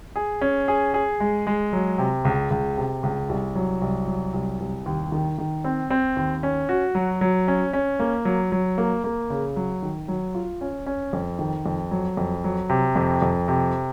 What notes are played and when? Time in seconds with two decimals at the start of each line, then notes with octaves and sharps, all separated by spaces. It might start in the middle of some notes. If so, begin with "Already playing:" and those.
0.16 G#4
0.41 C#4
0.68 G#4
0.94 G#4
1.20 G#3
1.47 G#3
1.73 F#3
1.98 C3
2.25 C#2
2.51 C#2
2.77 C3
3.03 C#2
3.29 C2
3.56 F#3
3.82 C2
4.08 F#3
4.34 C2
4.60 C2
4.86 D#2
5.12 D#3
5.38 D#3
5.64 C4
5.90 C4
6.17 D#2
6.43 C#4
6.69 F#4
6.95 F#3
7.21 F#3
7.48 C#4
7.73 C#4
8.00 A#3
8.25 F#3
8.52 F#3
8.78 A#3
9.04 A#3
9.30 C#3
9.56 F#3
9.83 D#3
10.08 F#3
10.34 F4
10.61 C#4
10.86 C#4
11.13 F2
11.39 D#3
11.66 F2
11.91 F#3
12.17 F2
12.44 F#3
12.69 C3
12.96 F2
13.22 F2
13.48 C3